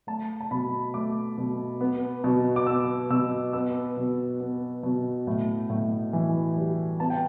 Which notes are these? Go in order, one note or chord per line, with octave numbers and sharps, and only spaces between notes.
A3 A5
A5
B2 B5
A3 D6
B2
B3
B2
D6
B3 E6
B2 E6
B3 E6
B2
B3
B2
A2
A2
E3
G3
B3 A5
G5